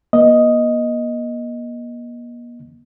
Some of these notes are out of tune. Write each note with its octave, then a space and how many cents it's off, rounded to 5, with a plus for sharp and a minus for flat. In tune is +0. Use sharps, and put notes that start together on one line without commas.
A#3 +45 D#5 +0